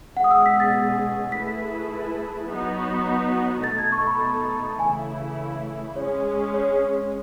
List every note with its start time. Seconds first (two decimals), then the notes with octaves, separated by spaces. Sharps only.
0.16 B2 G#3 C#4 G#4 F#5
0.24 D#6
0.31 E6
0.46 B6
0.60 A6
1.32 A3 E4 G#4 B4 B6
2.48 F#3 B3 D#4 F#4
3.64 B2 A3 D#4 A4 A6
3.78 G#6
3.92 C#6
4.07 B5
4.79 C#3 E3 A3 E4 G#5
5.96 G#3 C#4 G#4 C#5
6.54 C#5